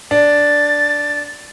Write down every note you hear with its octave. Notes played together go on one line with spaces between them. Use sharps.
D4 A6